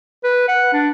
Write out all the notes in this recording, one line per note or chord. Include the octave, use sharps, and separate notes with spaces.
B4
F#5
D4